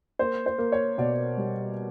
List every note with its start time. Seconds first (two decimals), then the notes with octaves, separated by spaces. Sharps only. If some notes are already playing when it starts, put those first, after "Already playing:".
0.19 A#3 C5
0.46 C5
0.58 A#3
0.72 C#5
0.98 B2 D5
1.37 G3